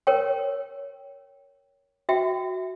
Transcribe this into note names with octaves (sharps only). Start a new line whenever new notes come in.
A#4 C#5 G5
F#4 E5 G5